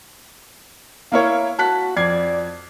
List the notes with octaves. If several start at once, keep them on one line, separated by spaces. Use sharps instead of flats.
A#3 E4 C#5 F5
F#4 A5 F#6 B6
F2 D5 G#6 C7